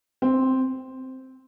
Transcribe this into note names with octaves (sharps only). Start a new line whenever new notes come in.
C4